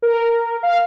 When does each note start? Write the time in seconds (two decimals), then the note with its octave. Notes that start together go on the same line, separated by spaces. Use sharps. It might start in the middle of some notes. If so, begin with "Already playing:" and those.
0.02 A#4
0.63 F5